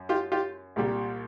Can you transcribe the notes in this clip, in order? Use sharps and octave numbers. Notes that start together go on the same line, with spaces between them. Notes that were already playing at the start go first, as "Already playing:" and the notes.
Already playing: F#2
F4 G4
F4 G4
C2 A#2 G3